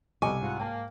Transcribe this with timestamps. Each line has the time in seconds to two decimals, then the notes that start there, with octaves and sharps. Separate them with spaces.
0.22 C2 B2 G3 D#5 G#5 C#6 D6
0.42 G#2 F4 F#5
0.59 A#3 G5 A5